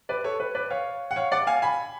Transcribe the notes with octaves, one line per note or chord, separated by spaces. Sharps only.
B4 D5
A4 C#5
B4
B4 D5
C#5 F5
F#5
C#5 F5
D5 F#5
F5 G#5
G#5 B5